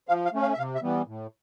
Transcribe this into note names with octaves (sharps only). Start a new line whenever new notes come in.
F3 F5
F5
A3 C#4
F5
E5
C3 F5
E5
E3 G3 B3
A2